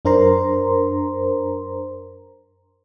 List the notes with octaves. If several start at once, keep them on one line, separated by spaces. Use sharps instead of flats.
F#2 D4 A#4 C5 A#5 C6